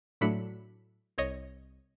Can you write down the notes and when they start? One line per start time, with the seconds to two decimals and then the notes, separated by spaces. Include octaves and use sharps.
0.21 A2 F#3 A3 D4 B5 C#7
1.18 C2 C#5 D#5